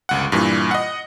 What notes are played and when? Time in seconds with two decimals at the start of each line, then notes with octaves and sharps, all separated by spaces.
0.09 G1 C#2 F#5
0.32 G2 A#2 E3
0.71 D#5 F#5